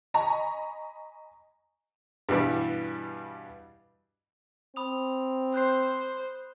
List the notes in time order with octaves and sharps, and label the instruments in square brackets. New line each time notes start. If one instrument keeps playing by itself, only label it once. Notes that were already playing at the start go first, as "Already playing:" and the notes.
[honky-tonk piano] D#5 G#5 A#5 B5 C#6
[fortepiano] G2 B2 E3 G3
[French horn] C4 [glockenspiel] B5 D#6 F7
[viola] C5 [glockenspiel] F#6 G6 C7